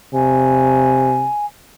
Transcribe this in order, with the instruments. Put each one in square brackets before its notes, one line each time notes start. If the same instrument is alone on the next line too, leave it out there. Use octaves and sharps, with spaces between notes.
[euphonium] C3 [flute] G#5